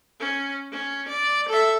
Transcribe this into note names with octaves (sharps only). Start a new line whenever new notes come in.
C#4
C#4
D5
A4 E5